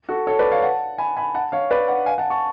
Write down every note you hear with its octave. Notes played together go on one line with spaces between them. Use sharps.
F#4 A4
A4 C#5
B4 D5
C#5 F5
F#5 A5
G#5 B5
G#5 B5
F#5 A5
C#5 F5
B4 D5
D5 F#5
F5 G#5
F#5 A5
A5 C#6